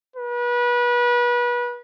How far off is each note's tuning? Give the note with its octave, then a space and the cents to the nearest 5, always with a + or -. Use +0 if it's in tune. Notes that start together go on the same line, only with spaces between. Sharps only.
B4 -30